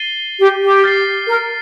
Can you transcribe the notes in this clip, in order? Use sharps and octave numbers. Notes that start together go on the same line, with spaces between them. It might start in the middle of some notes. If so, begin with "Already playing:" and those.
Already playing: A6 C7 D#7 G7
G4
G4
F6 A6 C7
A#4